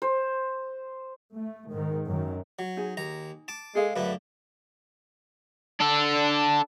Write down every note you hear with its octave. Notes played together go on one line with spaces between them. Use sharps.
C5
A3
G#2 D#3
F#2 D#3
F#3
D#4 G#4 G#5
D#2 A#5
A5 D6
G#3 G#4 A4 F5
F#2 D3 A3 B4
D4 A4